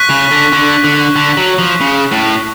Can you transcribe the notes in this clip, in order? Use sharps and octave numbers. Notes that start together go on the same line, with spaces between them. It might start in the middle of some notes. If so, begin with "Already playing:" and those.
Already playing: C#6 F#6 B6
C#3
D3
D3
D3
D3
F#3
F3
C#3
A2